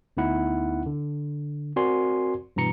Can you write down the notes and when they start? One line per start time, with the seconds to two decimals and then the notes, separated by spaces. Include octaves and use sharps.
0.17 D2 B3 D#4 E4 F#5
0.86 D3
1.76 C4 F#4 A#4 D5 G#5 C6
2.56 G2 B2 E3 A#5 C#7